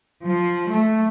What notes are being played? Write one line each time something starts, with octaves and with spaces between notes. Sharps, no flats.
F3
A3